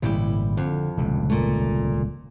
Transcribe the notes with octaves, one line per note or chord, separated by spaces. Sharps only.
G#1 A#2 C#3 G3 E4 G4
F2 D3
D#1 C#2 C3
A#2 A3